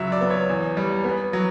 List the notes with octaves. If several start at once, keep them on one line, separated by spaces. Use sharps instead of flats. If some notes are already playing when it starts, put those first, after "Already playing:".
Already playing: C#2 F#3 E5
D5
B3
C#5
E2
G3
B3
F#3